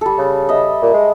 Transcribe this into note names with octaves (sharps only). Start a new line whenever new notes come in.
G3 A4
C#3
D#5 E5
A#2
G#3